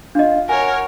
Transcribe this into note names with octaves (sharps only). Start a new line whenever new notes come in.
D4 F4 D#5
F#4 A#4 C#5 G#5